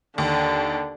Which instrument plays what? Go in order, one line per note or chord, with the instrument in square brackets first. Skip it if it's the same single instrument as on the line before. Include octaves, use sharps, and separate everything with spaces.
[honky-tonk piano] D#2 [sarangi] D3